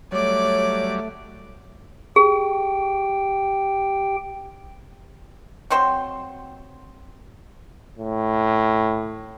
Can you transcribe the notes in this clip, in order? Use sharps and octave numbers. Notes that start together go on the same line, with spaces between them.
F#3 G3 A3 C#5 D5 D6
G4 G#4 G5
F#3 C4 C5 G5
A2